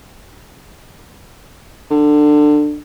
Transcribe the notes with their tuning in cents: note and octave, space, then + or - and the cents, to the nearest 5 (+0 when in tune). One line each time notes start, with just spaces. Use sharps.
D3 +20